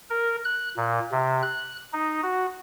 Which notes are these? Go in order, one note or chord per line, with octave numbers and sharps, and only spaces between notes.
A#4
F#6
A#2
C3
F#6
D#4
F#4